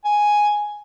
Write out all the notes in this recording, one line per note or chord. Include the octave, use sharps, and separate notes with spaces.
G#5